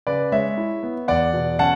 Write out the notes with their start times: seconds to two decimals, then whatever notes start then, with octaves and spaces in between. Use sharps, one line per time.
0.07 C#3 B4 D5
0.32 G#3 C#5 E5
0.57 E4
0.83 B3
1.08 E2 D5 F#5
1.34 B2
1.59 C#4 F#5 A5